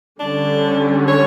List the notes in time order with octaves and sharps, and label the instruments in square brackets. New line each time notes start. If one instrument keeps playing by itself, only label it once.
[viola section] D3 G3 C#4 [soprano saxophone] D4
[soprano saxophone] C#5